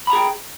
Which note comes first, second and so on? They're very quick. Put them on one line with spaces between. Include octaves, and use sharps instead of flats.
B5 A#5 G#4 G5